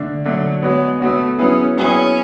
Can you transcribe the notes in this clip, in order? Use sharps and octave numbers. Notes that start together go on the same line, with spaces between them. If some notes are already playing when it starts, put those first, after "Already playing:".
Already playing: D3 A3 D4
D3 F#3 A3 D4
G#3 B3 F#4 C#5
A3 B3 F#4 C#5
F#3 B3 C#4 E4 G#4 B4
F#3 B3 C#4 E4 G#4 B4